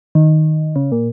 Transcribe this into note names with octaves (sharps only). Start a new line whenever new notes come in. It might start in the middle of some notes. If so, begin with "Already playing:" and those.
D#3
C#3
A#2